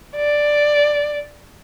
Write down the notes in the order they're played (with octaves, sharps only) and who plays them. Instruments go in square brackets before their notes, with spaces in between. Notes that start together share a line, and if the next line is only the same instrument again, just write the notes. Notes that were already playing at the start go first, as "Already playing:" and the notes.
[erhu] D5